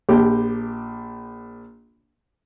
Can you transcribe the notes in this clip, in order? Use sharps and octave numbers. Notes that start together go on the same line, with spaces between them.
A#1 G4